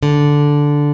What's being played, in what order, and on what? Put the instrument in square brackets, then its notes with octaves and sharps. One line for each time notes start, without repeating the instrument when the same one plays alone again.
[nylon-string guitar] D3